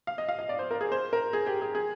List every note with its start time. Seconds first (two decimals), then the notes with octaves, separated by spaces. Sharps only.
0.07 F5
0.18 D#5
0.29 F5
0.39 D#5
0.49 D5
0.59 C5
0.71 A#4
0.81 G#4
0.92 C5
1.13 A#4
1.33 G#4
1.47 G4
1.62 G#4
1.75 G#4